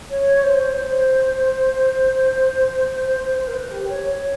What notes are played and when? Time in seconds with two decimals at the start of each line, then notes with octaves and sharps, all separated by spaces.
0.10 C#5
0.43 C5
0.76 C5
3.39 C5
3.48 A#4
3.55 B4
3.71 G4
3.88 C#5
4.05 C#5